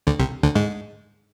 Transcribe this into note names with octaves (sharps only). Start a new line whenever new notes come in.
D2 D3
C2 C3
D2 D3
G#2 G#3